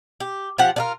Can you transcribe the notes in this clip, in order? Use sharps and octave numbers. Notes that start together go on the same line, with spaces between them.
G4
F3 G4 F#5
D4 F4 A#4